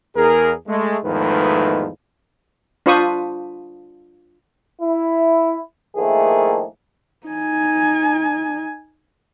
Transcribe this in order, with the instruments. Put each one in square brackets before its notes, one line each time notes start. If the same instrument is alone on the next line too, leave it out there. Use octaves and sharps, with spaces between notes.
[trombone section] E2 G#4 A#4
G#3 A3
E2 G#2 D#3 F3 A3 B4
[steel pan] D4 F4 C5 B5 C#6 D#6
[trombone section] E4
A2 D#3 F3 A3 A#3 G#4
[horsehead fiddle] D#4 G#5